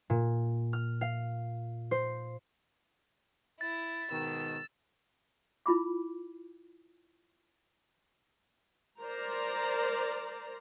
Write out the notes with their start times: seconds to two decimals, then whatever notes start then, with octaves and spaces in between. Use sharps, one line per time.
0.10 A#2
0.73 F6
1.01 F5
1.91 C5
3.61 E4 A6
4.11 G#2 B2 D#3 E6
5.66 E4 F4 B5 D6
9.01 A#4 C5 D5 A#5